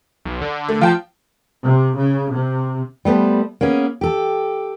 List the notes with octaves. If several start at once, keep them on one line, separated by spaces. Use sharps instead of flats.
B1
D3
A3
F3 F4 G5 A5
C3
C#3
C3
G3 A3 B3 A4 C5
A#3 B3 C#4 G#4
G4 A4